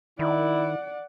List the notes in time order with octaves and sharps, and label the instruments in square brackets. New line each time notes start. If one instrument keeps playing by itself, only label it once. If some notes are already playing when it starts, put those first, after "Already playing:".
[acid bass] D#3 [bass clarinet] E4 [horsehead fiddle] D5 F#5